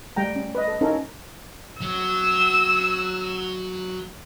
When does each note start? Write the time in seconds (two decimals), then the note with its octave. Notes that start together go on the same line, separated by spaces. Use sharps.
0.16 G3 A3 G5 A#5
0.36 C#4
0.55 B4 D#5
0.68 A4
0.81 C#4 D#4 E4 A4 A#4
1.82 F#3 E6